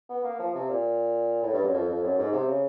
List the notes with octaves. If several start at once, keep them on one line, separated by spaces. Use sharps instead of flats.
B3
A#3
F3
C3
A#2
A2
G2
F#2
F2
F2
F#2
G#2
C3
C#3